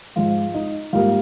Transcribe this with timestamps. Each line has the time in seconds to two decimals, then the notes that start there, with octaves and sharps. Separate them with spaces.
0.16 G#2 F3 G#3 F4
0.54 D#4
0.93 G#2 G3 A#3 F4